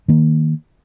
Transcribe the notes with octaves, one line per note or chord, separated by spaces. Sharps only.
D#3 A#3